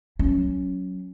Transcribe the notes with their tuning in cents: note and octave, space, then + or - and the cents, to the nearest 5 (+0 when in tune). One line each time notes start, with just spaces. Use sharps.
F#3 +0 C#4 +0